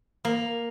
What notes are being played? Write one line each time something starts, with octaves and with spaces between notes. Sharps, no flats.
A#3